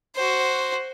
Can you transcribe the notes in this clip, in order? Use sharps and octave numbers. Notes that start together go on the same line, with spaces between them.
F#4 C5